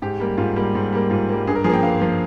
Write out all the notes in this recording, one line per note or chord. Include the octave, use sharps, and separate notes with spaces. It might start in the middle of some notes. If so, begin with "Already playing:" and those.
G#2 G4
G3 A#3
G#2 F4
G3 A#3
G#2
G3 A#3
G#2 F4
G3 A#3
G2 G#4
A#4
F3 G#4
A#3 G5
G2 F5
F3 A#3